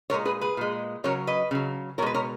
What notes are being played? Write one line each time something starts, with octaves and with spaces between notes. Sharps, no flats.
A#2 G#3 A#4 C#5
G#4 B4
G#4 B4
A#2 G#3
C#3 F#3 A#4 C#5
B4 D#5
C#3 F#3
B2 G#3 A#4 B4 C#5
A#4 C#5